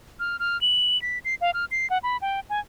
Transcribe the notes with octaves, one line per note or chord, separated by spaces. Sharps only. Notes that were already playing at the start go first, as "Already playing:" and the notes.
F6
F6
F#7
B6
C7
F5
F6
C7
F#5
B5
G5
G#5